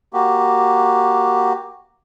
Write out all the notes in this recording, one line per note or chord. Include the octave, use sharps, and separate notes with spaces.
A#3 F#4 G4